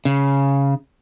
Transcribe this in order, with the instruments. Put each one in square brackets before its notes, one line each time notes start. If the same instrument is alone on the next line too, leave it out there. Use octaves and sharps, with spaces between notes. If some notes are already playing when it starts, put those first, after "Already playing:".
[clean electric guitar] C#3